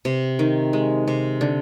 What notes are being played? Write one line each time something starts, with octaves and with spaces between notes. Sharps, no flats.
C3
D#3
G#3
C3
D3